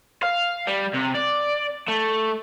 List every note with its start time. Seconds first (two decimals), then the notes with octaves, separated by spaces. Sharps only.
0.23 F5
0.67 G3
0.94 C3
1.15 D5
1.88 A3